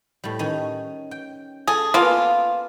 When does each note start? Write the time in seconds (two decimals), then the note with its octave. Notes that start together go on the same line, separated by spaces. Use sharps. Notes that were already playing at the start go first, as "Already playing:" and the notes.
0.24 A2 G3
0.39 D#3 C#4
1.11 G5
1.68 G#4 A4
1.94 A#3 B3 F4